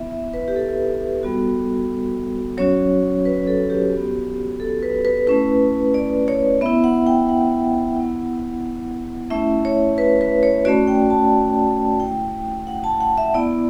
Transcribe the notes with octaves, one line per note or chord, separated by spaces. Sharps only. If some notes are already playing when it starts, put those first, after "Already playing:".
Already playing: B3 E4 E5
E5
B4
G4
A4
G3 B3 F#4
F#3 C#4 F#4 C#5
B4
A4
G4
B3 F#4
A4
B4
B4
A3 C#4 E4 B4
D5
C#5
B3 E4 E5
F#5
G5
F#5
B3 E4
A3 C#4 E4 E5
C#5
B4
B4
C#5
A3 C#4 F#4 D5
G5
A5
A3 E4 G5
F#5
A5
F#5
E5
B3 E4 D5